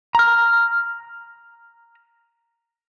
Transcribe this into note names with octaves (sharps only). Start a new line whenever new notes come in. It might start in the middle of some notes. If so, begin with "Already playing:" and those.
A#5 F6